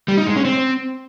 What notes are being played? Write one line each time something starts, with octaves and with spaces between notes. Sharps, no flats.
G3
D#4
G#3
C#4
C4